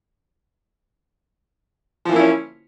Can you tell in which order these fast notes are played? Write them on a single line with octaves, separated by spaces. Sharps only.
F3 E3 A#3 E4 C#4